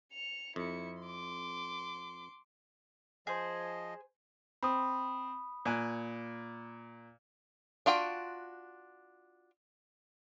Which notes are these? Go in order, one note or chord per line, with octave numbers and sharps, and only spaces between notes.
C#7 F7
F2 E4 C#7
C6 D6
F3 G#4 C5 D#5
C4 B5 D#6
A#2 G#5 F#6
D4 F4 F#4 G5